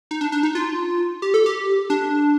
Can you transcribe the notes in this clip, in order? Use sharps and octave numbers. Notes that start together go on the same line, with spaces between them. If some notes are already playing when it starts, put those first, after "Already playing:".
D#4
D4
D4
D#4
F4
G4
A4
G4
D4